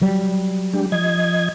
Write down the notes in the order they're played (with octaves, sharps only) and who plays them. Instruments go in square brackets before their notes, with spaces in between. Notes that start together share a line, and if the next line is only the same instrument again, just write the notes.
[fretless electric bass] F#3 G3
[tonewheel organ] G#3 D4 G4
F3 D#5 G#6